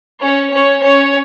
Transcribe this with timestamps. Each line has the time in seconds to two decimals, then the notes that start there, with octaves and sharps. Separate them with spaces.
0.23 C#4 C#5
0.52 C#4 C#5
0.82 C#4 C#5